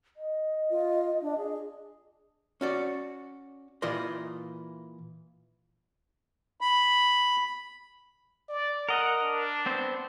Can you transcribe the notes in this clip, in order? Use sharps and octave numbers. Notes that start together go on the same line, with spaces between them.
D#5
F4
D4
G#4
C#4 F#4 D5
A#2 E3 F4 D5 D#5 C6
B5
D5
A#4 D#5 F#5
D4
B3 C4 C5